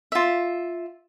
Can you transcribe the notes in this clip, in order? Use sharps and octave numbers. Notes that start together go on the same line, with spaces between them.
F4 E5